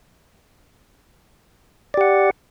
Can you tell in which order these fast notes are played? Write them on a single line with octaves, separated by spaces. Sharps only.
D5 G4 F#5